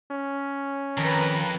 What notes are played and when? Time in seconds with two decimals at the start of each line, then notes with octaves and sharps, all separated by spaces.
0.11 C#4
0.98 F2 D#3 B4 A#5